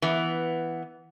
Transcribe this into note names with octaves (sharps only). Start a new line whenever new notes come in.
E3 B3